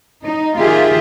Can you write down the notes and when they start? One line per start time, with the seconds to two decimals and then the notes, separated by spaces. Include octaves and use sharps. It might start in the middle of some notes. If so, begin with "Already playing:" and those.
0.22 D#4
0.58 D#3 F4 G4 G#4 E5